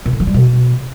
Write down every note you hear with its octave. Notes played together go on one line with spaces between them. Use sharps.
A#2
A2
F3
G3
B2